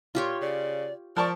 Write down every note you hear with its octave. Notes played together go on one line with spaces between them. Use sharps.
A#2 F4 G4 C#5 C6
C#3 D5
F3 A#4 D5 A5 C#6